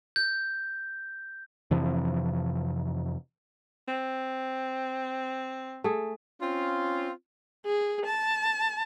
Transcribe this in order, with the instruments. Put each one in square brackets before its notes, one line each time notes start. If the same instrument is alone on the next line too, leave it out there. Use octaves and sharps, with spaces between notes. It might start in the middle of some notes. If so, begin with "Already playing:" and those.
[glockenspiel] G6
[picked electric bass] F2 C3 E3 F3
[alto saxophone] C4
[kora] A3 G#4
[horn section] C4 C#4 F4
[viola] G#4
A5